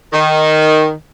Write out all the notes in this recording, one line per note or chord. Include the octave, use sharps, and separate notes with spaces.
D#3